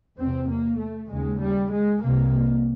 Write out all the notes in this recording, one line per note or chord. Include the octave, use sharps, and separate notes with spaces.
E2 C3 C4
A#3
A3
D#2 C#3 G#3
G3
G#3
C2 C3 A#3